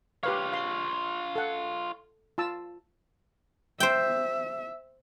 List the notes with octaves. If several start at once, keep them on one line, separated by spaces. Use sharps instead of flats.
F4 G4 B4 C#5 F5
F5 C6
A4 F#5
F4 A5 E6
C5 E5 G5